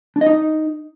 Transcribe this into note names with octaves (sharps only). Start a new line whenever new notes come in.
D4
D#5
D#4